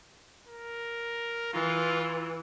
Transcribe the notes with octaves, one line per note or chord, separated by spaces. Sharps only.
A#4
E3 F4